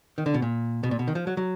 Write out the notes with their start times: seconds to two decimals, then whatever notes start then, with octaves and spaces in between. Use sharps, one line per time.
0.18 D#3
0.26 D3
0.34 B2
0.42 A#2
0.83 B2
0.91 A#2
0.99 B2
1.08 D#3
1.15 F3
1.27 F#3
1.37 F#3